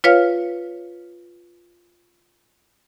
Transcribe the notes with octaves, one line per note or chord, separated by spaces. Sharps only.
F4 B4 C#5 F5 F6